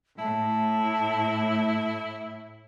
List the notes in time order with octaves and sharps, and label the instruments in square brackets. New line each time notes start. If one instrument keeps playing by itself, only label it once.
[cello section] A2 [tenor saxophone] E4 [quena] A5